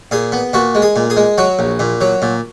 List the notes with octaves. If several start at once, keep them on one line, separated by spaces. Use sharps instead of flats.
A#2 G#4
B3
A#2 F#4
G#3
G#4
A#2
G#4
G#3
F#3 F#4
A#1
A#2
F#3
A#2